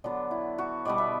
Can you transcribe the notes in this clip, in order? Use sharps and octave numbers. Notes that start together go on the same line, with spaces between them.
D3 F#3 B3 D4
E4
F#4
B2 G3 B3 D5
E5